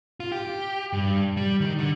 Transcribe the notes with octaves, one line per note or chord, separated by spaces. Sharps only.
F4
G4
G2
G3
D#3
D3